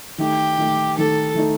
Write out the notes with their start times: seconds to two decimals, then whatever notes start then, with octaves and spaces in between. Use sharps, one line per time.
0.18 D#3 A3 D#4 G4
0.58 D#3 A3 D#4
0.97 D#3 A3 D#4 A4
1.35 D#3 A3 D#4